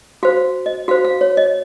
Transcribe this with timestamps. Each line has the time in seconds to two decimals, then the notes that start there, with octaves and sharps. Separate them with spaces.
0.23 F#4 C5 F5
0.66 D#5
0.88 F#4 C5 F5
1.05 F5
1.21 C#5
1.37 D#5